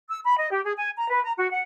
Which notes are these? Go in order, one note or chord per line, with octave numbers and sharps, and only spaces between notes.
E6
B5
D#5
G4
G#4
G#5
A#5
B4
A#5
F#4
F#5